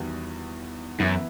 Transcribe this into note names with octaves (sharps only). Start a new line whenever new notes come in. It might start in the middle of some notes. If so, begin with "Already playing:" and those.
Already playing: E2 D#3 G3 B3 F#4
F#2 E3 B3 E4